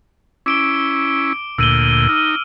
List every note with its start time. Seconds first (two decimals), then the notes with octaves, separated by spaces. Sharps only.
0.46 C#4 E4 D6 D7 G7
1.58 D2 A#2 E6 D#7 G7
2.09 D#4 F6